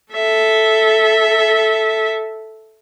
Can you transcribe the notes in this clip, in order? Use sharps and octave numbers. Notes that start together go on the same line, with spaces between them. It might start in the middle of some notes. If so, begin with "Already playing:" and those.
A4 E5